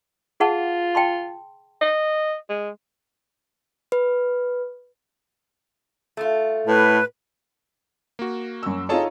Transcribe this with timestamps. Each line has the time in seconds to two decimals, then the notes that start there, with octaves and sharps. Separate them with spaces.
0.40 F4 G#4 F#5 A5
0.95 G5 A5 C6
1.81 D#5
2.49 G#3
3.92 B4
6.17 A3 F4
6.67 A2 B4
8.19 A#3 F#4
8.63 F#2 E6
8.89 D#4 F4 G#4 A4 C#5 A5